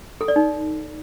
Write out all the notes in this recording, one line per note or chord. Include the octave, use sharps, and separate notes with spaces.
A4
D5
D#4